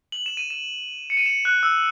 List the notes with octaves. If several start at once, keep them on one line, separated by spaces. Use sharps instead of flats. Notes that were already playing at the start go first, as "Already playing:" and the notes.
F#7
E7
D#7
E7
C#7
D#7
E7
F#6
E6